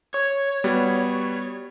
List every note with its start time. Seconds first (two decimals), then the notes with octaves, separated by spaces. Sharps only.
0.14 C#5
0.64 G3 B3 F#4